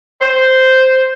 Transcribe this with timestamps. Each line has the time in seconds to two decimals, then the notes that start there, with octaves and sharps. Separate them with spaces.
0.21 C5